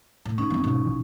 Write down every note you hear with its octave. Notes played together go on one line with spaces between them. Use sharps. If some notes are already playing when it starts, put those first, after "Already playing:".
A2
D3 C#4 D#4
F2 E3 G#3 B3 C4
G#2 B2
A#1 E3